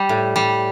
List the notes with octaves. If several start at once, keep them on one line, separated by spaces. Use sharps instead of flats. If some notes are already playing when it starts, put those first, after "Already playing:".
Already playing: G3 G4
A2
G3